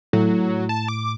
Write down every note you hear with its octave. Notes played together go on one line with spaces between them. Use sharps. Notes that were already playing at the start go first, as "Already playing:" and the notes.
A2 F#3
A5
D6